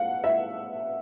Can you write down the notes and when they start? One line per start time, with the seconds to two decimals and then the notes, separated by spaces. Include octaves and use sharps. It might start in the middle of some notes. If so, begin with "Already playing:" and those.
Already playing: F5 F#5
0.24 E5